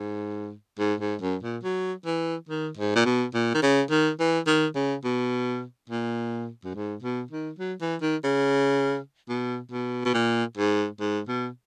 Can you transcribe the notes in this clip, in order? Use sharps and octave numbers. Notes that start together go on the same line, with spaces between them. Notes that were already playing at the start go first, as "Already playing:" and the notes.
Already playing: G#2
G#2
G#2
F#2
A#2
F#3
E3
D#3
G#2
A#2
B2
A#2
D#3
C#3
D#3
E3
D#3
C#3
B2
A#2
F#2
G#2
B2
D#3
F#3
E3
D#3
C#3
B2
B2
B2
A#2
G#2
G#2
B2